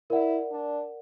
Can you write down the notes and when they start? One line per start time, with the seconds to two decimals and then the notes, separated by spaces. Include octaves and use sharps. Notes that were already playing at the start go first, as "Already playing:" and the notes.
0.10 E4 A#4 D5 F#5
0.52 D4